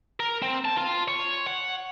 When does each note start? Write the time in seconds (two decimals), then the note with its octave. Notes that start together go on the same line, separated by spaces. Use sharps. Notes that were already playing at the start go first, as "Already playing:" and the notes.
0.20 A#4
0.42 C4
0.65 A5
0.77 F4
1.08 C#5
1.47 F#5